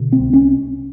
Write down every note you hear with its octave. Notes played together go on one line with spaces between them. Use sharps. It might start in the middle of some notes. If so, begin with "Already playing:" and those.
Already playing: B2 D3
C4
C2
C#4